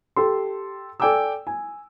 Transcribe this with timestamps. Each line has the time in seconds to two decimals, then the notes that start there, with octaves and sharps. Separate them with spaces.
0.16 G4 A4 C6
1.00 A4 D5 G5 G#5 D6 E6
1.47 G#5